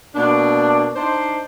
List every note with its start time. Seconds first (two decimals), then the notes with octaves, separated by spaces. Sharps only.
0.15 B2 A#3 D4
0.96 D4 D#4 C5